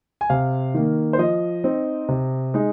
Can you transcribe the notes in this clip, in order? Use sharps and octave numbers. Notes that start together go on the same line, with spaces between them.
G#5
C3 F5
D#3 A#3
C5
F3 D#5
C4 D#4
C3
G#3 D#4